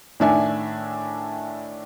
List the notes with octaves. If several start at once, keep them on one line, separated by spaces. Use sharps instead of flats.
A2 D#3 D4 E5 G#5